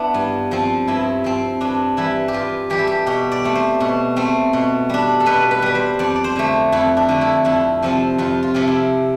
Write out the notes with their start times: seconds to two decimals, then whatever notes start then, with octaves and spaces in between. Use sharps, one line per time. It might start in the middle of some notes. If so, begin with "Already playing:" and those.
Already playing: B3 D4 E4
0.14 G2
0.51 F3 C4
0.87 G2 E4
1.24 F3 C4
1.61 G2 D4
1.97 E3 G3 E4
2.28 G4
2.33 G2 F4
2.70 E3 G3 G4
2.79 A4
2.87 G4
3.06 B2 G4
3.32 D5
3.44 A3 C4
3.55 C5
3.80 B2
4.16 A3 C4
4.53 B2
4.90 G3 D4
5.20 A4
5.26 B2 B4
5.51 B4
5.62 G3 D4
5.75 C5
5.99 F2 D5
6.16 D5
6.24 C5
6.36 D3 A3
6.72 F2 E4
6.97 D4
7.09 D3 A3
7.21 E4
7.45 F2 E4
7.83 C3 F3 C4
8.18 F2 F4
8.43 F4
8.54 C3 F3 C4
8.67 E4